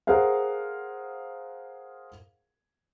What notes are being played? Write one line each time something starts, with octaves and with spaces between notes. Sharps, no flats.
G#4 A#4 C5 F5 F#5